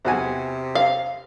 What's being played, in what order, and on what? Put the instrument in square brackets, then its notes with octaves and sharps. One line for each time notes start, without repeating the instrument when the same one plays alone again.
[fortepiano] E2 F#4 G#5 [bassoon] C3
[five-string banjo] F5